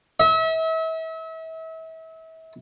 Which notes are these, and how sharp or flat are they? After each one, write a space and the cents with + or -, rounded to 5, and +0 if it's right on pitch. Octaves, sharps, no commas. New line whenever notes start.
E5 -35